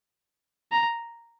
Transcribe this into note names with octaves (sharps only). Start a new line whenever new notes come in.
A#5